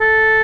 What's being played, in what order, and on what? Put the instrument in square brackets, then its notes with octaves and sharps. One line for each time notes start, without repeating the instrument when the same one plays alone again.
[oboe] A4